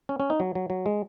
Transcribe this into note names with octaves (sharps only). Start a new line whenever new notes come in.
C#4
C#4
D#4
F#3
F#3
F#3
G#3